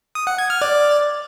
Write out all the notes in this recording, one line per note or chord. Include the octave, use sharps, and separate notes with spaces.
D#6
F#5
G#6
F6
D5